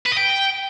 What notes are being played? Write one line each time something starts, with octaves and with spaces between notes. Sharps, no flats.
B4
D#5
G5